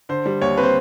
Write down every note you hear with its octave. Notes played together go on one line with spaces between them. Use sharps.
D3 C5
G3
D#2 C#5
C4 B4
C5